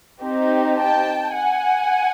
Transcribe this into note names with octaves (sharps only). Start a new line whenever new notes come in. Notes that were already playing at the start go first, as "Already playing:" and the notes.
C4 D#4 G4
G5 A5
F#5 G#5